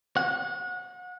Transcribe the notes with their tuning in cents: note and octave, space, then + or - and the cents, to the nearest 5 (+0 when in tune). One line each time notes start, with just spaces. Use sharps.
F#5 -30